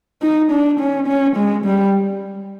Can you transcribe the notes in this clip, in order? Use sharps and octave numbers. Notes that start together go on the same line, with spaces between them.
D#4
D4
C#4
C#4
G#3
G3